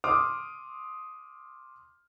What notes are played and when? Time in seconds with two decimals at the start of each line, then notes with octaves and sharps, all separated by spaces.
0.04 C6 D6 D#6 F6